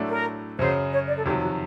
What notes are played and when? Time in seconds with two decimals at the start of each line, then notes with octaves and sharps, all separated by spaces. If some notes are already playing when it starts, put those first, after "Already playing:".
Already playing: A2 F#3 A3 D4
0.09 A#4
0.59 F#2 C#3 F#3 C5
0.92 C#5
1.08 D5
1.17 A4
1.25 F2 C3 D#3 F#3 G4
1.41 F#4